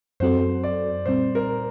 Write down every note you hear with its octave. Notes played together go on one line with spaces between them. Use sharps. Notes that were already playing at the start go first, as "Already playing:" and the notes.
F#2 F#3 C4 F#4 A4 C5
D5
A#2 G3 C4 C5
A#4